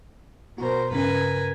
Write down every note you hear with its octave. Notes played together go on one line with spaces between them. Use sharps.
B2 F#4 A#4 C5
G2 C#3 A#4 B4 G#5